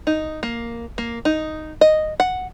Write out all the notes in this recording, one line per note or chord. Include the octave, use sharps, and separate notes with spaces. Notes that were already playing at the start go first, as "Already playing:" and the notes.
D#4
A#3
A#3
D#4
D#5
F#5